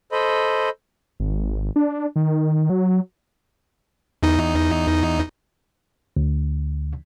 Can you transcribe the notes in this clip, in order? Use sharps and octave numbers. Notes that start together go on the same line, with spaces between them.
A4 C5 D#5 B5
G#1
D4
D#3
F#3
E2 D#4
D2